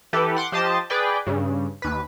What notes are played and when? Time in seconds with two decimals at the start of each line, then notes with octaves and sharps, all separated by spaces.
0.13 E3 G4 A4 B4
0.36 F#5 C6 D6
0.52 F3 G4 C5 D#5 A5 A6
0.90 G#4 B4 D5 G5
1.26 G2 C#3
1.82 D#2 B4